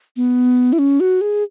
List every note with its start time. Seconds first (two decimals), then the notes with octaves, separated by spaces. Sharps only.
0.16 B3
0.73 E4
0.79 C#4
1.00 F#4
1.21 G#4